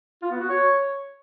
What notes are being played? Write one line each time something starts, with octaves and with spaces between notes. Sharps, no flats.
F4
B3
F#4
C#5